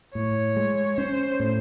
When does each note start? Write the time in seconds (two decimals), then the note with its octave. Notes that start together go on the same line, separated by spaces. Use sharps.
0.14 A2 C#5
0.56 G#3
0.98 C#4 C5
1.40 A2